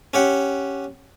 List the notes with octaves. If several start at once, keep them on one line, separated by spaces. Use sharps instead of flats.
C#4 G4 F#5